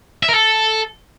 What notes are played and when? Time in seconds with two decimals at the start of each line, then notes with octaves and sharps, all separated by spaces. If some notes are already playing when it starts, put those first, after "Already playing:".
0.23 E5
0.28 A#4
0.34 A4